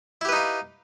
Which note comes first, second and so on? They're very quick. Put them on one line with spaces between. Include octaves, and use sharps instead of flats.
E4 G4 B4 D#4 F5